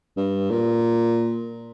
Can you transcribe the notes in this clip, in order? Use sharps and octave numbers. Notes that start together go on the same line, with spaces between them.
G2
A#2